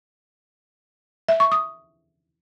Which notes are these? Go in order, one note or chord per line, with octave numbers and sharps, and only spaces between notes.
E5
C#6
D#6